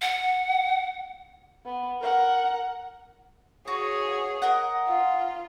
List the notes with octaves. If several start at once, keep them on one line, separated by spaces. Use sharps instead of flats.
F#5
B3
A#4 F#5
F#4 G#4 C#5
A#4 D#5 F#5
F4